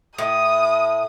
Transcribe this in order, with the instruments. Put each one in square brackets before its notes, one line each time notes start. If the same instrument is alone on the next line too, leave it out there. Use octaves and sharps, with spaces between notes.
[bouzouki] A2 [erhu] D#6